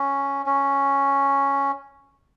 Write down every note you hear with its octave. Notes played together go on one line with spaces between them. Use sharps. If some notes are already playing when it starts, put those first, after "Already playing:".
Already playing: C#4
C#4